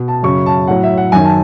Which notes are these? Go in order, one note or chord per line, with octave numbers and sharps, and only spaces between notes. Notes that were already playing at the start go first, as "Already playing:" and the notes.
Already playing: B2
A5
F#2 C#3 F#3 C#6
A5
A2 F#3 F#5
E5
F#5
F#2 D#3 F#3 G#5
A5